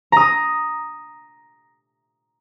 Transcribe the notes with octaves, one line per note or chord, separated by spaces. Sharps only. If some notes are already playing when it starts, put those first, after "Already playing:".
A#5 D#6